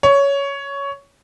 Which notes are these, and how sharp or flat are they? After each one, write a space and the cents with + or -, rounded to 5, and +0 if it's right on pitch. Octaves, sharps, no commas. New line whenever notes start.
C#5 +10